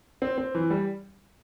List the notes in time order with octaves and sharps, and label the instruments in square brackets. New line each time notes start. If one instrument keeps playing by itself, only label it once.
[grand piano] C4
C4
E3
G3